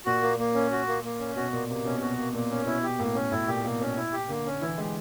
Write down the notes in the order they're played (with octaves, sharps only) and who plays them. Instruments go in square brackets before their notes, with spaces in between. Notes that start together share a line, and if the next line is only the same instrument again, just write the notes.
[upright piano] A#2 [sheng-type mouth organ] F#4
[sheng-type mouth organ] A#3
A#3
C#4
F#4
A#3
A#3
C#4
[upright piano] B2 [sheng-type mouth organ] F#4
[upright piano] A#2 [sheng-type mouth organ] A#3
[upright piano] C3 [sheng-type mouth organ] A#3
[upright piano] B2 [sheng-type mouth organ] C#4
[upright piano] B2 [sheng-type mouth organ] F#4
[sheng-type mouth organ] A#3
[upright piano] A#2 [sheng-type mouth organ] A#3
[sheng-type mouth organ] C#4
[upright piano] B2 [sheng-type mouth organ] E4
[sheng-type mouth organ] G4
[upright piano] A2 [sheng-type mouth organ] A#3
[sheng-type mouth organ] C#4
[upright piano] A2 [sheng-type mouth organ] E4
[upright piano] A#2 [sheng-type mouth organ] G4
[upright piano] B2 [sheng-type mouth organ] A#3
[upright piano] B2 [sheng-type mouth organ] C#4
[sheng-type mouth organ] E4
G4
[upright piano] D3 [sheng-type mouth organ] A#3
[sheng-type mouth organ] C#4
[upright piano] E3 [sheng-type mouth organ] E4
[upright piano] G#3 [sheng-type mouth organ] G4